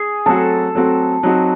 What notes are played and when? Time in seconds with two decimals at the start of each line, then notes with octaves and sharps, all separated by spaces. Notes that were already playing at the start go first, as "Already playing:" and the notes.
Already playing: G#4
0.26 F#3 A3 C4 F#4 A4
0.75 F#3 A3 C4 F#4
1.23 F#3 C4 D#4 F#4